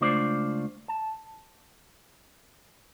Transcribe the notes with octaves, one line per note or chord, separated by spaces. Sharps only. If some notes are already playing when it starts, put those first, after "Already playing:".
C#2 A3 D4 F4 C5 D5
A5